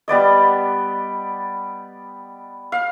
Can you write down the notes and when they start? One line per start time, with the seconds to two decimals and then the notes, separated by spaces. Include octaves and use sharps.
0.08 G3 B3 D5 D#5
2.72 F5